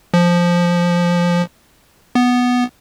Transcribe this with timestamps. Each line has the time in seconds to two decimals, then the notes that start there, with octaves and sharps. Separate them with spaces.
0.14 F3
2.15 B3